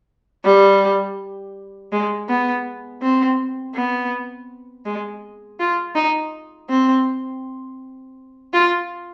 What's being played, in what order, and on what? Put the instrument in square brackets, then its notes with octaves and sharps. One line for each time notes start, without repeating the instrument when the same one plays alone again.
[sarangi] G3
G#3
B3
C4
B3
G#3
F4
D#4
C4
F4